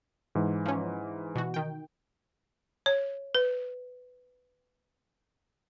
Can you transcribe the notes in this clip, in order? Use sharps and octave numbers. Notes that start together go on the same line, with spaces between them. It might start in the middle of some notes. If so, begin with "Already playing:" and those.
G#2 E3
F3 C#4
B2 E3 F#4
D#3 G5
C#5
B4